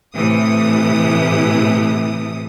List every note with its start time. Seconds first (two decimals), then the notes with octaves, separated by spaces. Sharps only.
0.15 A2 C3 E3 D#6